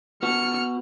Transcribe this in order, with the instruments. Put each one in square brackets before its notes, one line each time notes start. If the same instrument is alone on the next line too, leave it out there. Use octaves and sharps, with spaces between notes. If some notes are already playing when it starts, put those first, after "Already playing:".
[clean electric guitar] B3 F#4 [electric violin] F6 C#7